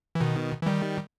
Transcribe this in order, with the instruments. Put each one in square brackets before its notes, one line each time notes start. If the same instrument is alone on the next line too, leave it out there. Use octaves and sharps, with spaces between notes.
[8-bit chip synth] E3
B2 D#3
E3
D#3 G3